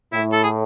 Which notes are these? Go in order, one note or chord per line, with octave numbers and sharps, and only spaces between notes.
A2 E4
A4
G#4